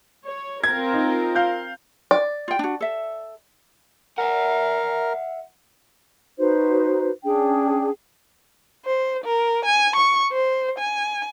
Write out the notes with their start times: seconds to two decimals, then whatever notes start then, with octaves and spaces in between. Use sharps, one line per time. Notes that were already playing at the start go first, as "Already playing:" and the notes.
0.24 C#5
0.64 C4 F4 A#4 G#6
0.93 D#4
1.35 F5 G6
2.11 D5
2.48 F4 G5
2.59 D4 F#4
2.81 A4 E5
4.18 A#4 E5 F#5
6.38 D#4 F#4 B4 C5
7.24 C#4 D4 G#4 G5
8.86 C5
9.24 A#4
9.65 G#5
9.96 C#6
10.32 C5
10.79 G#5